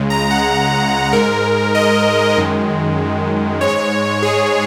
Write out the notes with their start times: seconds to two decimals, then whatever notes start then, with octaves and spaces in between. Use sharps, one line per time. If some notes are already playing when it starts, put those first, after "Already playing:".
Already playing: C#2 C#3 G#3
0.10 A#5
0.31 F#5
1.13 G#2 G#3 A#4
1.75 D#5
2.37 F#2 D#3 G#3
3.61 G#2 G#3 C#5
4.22 G#4